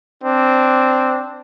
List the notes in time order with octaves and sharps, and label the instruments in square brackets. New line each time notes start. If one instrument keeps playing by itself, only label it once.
[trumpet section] C4 D4